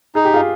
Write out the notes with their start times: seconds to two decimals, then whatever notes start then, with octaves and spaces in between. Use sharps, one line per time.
0.15 D#4 G#4
0.25 G4
0.34 F4 G#4